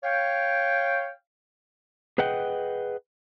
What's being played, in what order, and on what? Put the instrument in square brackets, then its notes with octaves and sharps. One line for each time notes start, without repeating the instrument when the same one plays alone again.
[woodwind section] C#5 F5 G5
[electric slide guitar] G#4 B4 D#5 F#5 G5